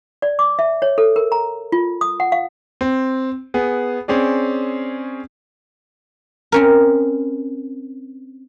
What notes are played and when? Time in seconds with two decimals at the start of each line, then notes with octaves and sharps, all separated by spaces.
0.22 D5
0.39 D6
0.59 E5
0.82 C#5
0.98 A4
1.16 A#4
1.32 A#5
1.72 F4
2.01 D#6
2.20 F#5
2.32 F5
2.81 C4
3.54 B3 G#4
4.08 C4 C#4 G#4 D5
6.52 C4 C#4 A#4